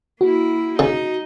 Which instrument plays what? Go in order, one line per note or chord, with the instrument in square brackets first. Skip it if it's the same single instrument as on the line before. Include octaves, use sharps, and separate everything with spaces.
[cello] A#3 E4 [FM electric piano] F#4
[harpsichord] C#3 [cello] D#4